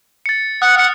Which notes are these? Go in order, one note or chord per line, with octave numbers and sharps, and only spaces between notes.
A6 C#7
F#5 D#6 F#6
F#5 F6 C#7